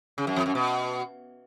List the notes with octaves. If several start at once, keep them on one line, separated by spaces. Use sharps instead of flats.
C#3
F#2
F2
F#2
B2